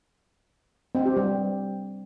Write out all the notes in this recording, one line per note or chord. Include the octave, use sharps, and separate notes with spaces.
C4
G4
G3